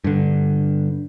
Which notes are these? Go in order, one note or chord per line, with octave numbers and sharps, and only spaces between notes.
G2 D3